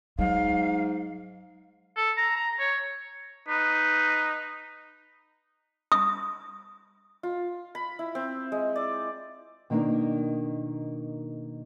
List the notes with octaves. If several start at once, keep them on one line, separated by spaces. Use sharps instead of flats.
G#2 F#3 F5
A4
A#5
A#5
C#5
D#4 B4
D#6
F4
B5
E4
C4
G#3
D5
B2 D#3 A#3 B3 D4 D#4